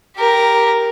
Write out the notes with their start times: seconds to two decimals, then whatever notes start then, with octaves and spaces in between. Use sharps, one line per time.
0.16 G4 A#4